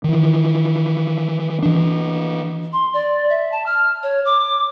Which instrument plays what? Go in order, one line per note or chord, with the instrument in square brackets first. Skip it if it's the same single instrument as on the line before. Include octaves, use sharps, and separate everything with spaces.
[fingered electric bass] D#3 E3
E3 D4
[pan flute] C6
D5
E5
A5
F6
C#5
D6